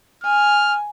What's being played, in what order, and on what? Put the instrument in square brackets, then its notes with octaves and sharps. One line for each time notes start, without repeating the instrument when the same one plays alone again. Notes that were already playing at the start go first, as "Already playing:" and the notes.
[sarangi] G#5 [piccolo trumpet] F6